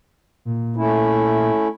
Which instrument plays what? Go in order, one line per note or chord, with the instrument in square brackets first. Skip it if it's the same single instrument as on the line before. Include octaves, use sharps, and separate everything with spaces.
[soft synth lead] A#2
[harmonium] A3 C#4 E4